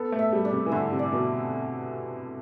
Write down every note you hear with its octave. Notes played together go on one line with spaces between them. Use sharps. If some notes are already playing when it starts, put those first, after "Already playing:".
Already playing: B3 A4
A3
E5
G3
D4
C3
E3
D3 E4
C3
D5
B2